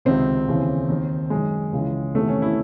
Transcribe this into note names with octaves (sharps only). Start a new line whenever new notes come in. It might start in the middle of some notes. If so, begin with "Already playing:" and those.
C#2 C3 D#3 C4
D#2 C#3 E3
D#2 D#3
F#2 D#3 G#3
C#2 C#3 E3
E2 C3 D#3 A3
C#4
E4